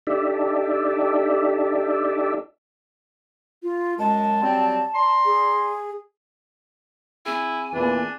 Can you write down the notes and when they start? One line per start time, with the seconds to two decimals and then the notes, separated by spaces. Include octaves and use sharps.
0.07 D4 D#4 G4 A4 D5 E5
3.63 F4
3.99 F#2 G#3 A5
4.42 F#3 G3 C4
4.95 D5 A#5 C6
5.25 G#4
7.26 C4 E4 G#4 G#5
7.74 E2 A#2 E3 D4